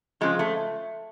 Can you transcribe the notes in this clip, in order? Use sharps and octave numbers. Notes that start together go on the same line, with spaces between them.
F2 C#3 F3 G#3
A3